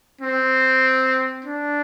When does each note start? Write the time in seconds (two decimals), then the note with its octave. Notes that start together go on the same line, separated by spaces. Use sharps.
0.21 C4
1.45 D4